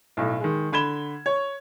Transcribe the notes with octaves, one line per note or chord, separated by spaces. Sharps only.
B1 A2
D#3 G#3
D3 B5 G#6 E7 G7
C#5